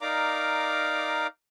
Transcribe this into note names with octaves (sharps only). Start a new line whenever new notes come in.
D#4 A#4 D5 F5 A#5 D6